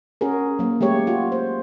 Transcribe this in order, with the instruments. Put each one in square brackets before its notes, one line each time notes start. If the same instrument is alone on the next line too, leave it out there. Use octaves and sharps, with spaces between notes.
[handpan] C#4 F#4 G#4 A#4
F#3 A#3
G#3 A3 G4 C#5
F4 F#4
C5